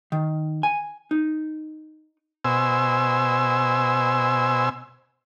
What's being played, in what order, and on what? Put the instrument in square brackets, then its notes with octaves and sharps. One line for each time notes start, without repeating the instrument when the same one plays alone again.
[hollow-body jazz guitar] D#3
G#5
D#4
[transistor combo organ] B2 C5 G#5 E6